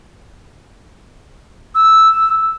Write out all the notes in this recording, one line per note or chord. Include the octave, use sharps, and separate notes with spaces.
E6